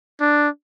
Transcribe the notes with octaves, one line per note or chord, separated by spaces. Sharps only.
D4